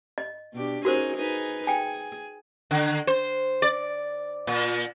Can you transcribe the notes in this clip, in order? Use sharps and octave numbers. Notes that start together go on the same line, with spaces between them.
D#5
B2 D4 G4
C#4 D#4 F#4 G#4 A#4 C5
D#4 G#4 B4
G#4 G5 G#5
D3
C5
D5
A#2